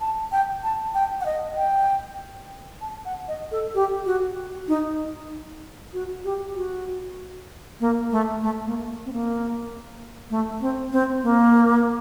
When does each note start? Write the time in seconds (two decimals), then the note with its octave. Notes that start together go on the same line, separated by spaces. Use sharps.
0.01 A5
0.32 G5
0.64 A5
0.95 G5
1.21 F#5
1.26 D#5
1.57 G5
2.81 A5
3.05 F#5
3.28 D#5
3.51 A4
3.75 G4
4.06 F#4
4.68 D#4
5.93 F#4
6.25 G4
6.56 F#4
7.80 A#3
8.11 A3
8.43 A3
8.66 A#3
9.06 C4
9.13 A#3
10.30 A3
10.61 C4
10.92 C4
11.23 A#3